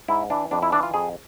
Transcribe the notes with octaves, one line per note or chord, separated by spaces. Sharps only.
G#2 E4
E3 D4
F2 D4
E4
E3 D4
F4
F2 G#4